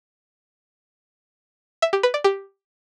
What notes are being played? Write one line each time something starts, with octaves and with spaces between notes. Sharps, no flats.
E5
G4
B4
D5
G4